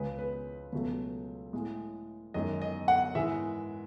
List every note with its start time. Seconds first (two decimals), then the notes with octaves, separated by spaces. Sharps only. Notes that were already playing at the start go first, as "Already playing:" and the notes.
Already playing: C#2 C#3 G#3 B4
0.19 B4
0.73 C#2 B2 F#3 A3
1.53 A2 G#3
2.34 F#2 D#3 G#3 D#5
2.62 D#5
2.88 F#5
3.15 G#2 E3 G#3 E5